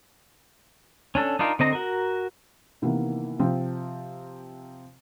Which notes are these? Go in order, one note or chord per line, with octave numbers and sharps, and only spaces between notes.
C#4 D4 A4
D4 D#4 F4 A#4
D3 C4 D#5 A#5
F#4 A#4
C3 D#3 E3 A#3 B3
C3 F3 C4